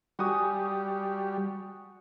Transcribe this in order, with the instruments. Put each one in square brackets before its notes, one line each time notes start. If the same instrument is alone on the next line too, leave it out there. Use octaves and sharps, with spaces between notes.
[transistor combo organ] G3 [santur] F#4 G#5 D#6